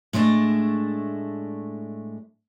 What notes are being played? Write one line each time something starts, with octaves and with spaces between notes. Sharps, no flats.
A2 G#3 A3 D4 D#5